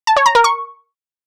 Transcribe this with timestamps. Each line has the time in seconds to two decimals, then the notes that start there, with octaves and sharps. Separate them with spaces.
0.07 A5
0.17 C#5
0.26 A#5
0.35 A#4
0.44 C#6